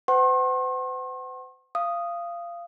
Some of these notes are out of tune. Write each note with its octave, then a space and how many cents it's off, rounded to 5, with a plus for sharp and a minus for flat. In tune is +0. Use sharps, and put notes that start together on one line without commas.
C5 -45 F#5 +35 C6 +45
F5 -20 D#6 -5